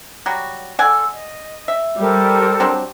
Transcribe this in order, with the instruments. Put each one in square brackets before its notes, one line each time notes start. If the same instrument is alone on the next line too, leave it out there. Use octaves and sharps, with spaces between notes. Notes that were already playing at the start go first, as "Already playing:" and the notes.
[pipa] F#3 G3 F#4
[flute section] A4 C6 E6 [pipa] D5 F#5 G#5
[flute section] D#5
[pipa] E5
[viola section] G3 [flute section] A4 A#4 C5
[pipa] F#3 C4 D4